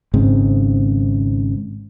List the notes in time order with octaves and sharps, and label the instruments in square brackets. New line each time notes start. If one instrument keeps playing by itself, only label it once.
[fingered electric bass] G#1 G#2 C#3 C4